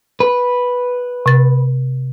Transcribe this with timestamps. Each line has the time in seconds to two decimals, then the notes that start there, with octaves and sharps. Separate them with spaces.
0.20 B4
1.26 C3 A6